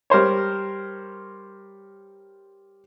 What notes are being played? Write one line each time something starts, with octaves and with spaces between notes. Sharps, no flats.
G3 A#4 C5 C#5